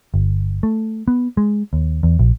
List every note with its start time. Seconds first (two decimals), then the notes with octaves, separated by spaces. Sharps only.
0.14 G1
0.63 A3
1.08 B3
1.37 G#3
1.73 D#2
2.03 E2
2.19 A#1